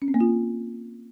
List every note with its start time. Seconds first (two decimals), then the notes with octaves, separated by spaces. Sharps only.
0.02 C#4
0.08 C4
0.14 A#3
0.21 F4